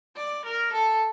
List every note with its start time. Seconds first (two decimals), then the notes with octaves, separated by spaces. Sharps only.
0.16 D5
0.45 A#4
0.73 A4